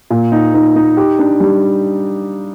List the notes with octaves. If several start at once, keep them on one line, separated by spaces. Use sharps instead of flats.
A#2
D#4
D#4
D#4
G4
D4
G3